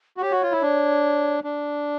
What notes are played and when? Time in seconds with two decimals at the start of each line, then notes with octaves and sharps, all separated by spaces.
0.17 F#4
0.21 G4 C#5
0.32 F#4
0.42 F4
0.52 E4
0.62 D4
1.44 D4